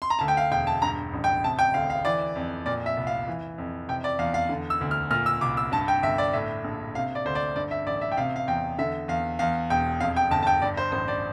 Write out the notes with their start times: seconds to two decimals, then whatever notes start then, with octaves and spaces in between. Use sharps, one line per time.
0.02 C6
0.10 A#5
0.19 D2 A5
0.28 G5
0.37 F5
0.51 E1 G5
0.67 A5
0.82 G2 A#5
1.13 A1
1.24 G5
1.44 C3 A5
1.59 G5
1.74 D2 F5
1.90 F5
2.05 E3 D5
2.36 F2
2.66 A#2 D5
2.86 E5
2.97 C2
3.07 F5
3.27 E3
3.58 F2
3.89 C3 G5
4.04 D5
4.19 E2 F5
4.34 F5
4.49 D3
4.70 E6
4.81 D2
4.91 F6
5.10 A#2 F6
5.26 E6
5.41 C2 D6
5.57 E6
5.72 G2 A5
5.88 G5
6.03 G1 E5
6.18 D5
6.33 A2 E5
6.64 A#1
6.95 C3 F5
7.15 D5
7.25 D2 C5
7.35 D5
7.56 G2 D5
7.71 E5
7.86 A1 D5
8.01 E5
8.12 G5
8.17 C3 F5
8.36 F5
8.48 E2 G5
8.78 D3 E5
9.08 E2 F5
9.39 E2 F5
9.70 E1 G5
10.00 F2 F5
10.16 G5
10.31 G1 A5
10.43 A5
10.47 G5
10.62 G2 D5
10.77 C5
10.92 A1 C5
11.08 D5